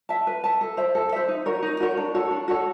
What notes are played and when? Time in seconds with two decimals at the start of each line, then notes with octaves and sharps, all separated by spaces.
0.09 E5 A5
0.27 B4
0.44 E5 A5
0.61 A4
0.77 C5 E5
0.95 A4
1.12 C5 E5
1.28 D#4
1.46 F#4 A#4 C#5
1.62 D#4
1.80 F#4 A#4 C#5
1.97 D4
2.15 F#4 A4 C#5
2.31 D4
2.48 F#4 A4 C#5